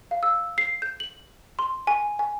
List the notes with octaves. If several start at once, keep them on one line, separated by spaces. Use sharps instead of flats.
F5
E6
C7
G6
F#7
C6
G#5
G#5